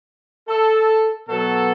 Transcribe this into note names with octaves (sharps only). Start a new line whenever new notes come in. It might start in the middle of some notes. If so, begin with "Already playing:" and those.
A4
B2 F#3 A4